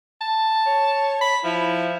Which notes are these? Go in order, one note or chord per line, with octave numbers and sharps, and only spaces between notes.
A5
C#5
B5
F3 E4